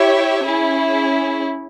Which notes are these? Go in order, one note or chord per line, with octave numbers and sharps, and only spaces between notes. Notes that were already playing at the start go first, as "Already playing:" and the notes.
Already playing: E4 G4 C#5 E5
C#4 E4 G#4